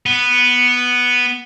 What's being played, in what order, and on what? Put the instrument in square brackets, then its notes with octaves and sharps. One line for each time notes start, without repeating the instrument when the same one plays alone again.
[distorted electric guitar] B3